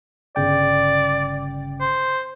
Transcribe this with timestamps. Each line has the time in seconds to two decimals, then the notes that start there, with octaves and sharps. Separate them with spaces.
0.36 G1 C#3 D5 G5
1.81 C5